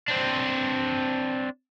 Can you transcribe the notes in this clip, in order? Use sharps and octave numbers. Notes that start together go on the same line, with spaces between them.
C4 D4